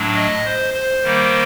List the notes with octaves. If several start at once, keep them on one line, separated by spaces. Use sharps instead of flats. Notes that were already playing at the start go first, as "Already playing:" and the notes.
Already playing: A2 F#3 A3 D4
D#5
C5
C5
D#3 G3 A#3